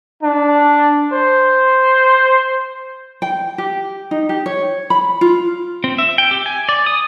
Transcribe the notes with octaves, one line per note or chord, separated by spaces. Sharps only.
D4
C5
G5
G4
D#4
G4
C#5
B5
F4
C4
E5
G5
G4
G#5
D5
D#6